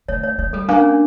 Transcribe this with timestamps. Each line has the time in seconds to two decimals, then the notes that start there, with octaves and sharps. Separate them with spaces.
0.08 A3 C#5
0.23 C#5
0.38 A3 C#5
0.53 G3 A4
0.68 A#3 D4
0.78 C#4
0.89 D4